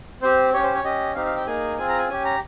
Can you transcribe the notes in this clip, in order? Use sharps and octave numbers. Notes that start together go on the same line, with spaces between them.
C4 G4 C5
C#4 G4 C#5
C5
C#5
C#4 G4 D#5
C4 D#4 G4 F5
F5
G5
A#3 D#4 G#4 G#5
C4 F4 G#4 G#5
A#5
G#5
C#4 G4 G#5
A#5